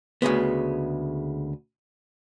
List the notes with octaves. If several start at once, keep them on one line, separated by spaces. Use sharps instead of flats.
D2 C#3 G#3 B3